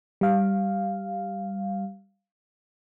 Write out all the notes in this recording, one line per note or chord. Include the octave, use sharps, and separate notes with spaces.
G3 F5